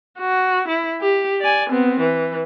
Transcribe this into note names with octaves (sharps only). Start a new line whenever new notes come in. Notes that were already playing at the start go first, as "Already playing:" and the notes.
F#4
E4
G4
D5 G#5
B3 C4
E3